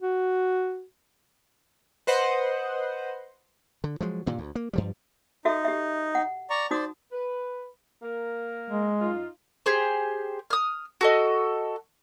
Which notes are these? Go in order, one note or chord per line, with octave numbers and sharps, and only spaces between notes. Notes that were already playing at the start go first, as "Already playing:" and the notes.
F#4
B4 C5 D#5 F#5
D3
F3 F#3 G#3
G2 A#2 D#3
D2
A#3
G2 F3 G3
D#4 F#4 A4 E5
G4 E5
F#5
D5 A#5 C#6
D#4 F#4 C5 D5 D#6
B4
A#3 A#4
G#3
F#2 D#4 F4
G4 G#4 C5
D#6 F6
F#4 A4 D#5